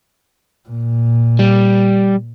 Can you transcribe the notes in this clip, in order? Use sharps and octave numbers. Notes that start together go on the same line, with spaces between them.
A#2
G3